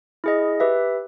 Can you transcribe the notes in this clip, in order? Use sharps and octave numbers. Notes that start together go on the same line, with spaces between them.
E4 G#4 D#5
G4 B4 E5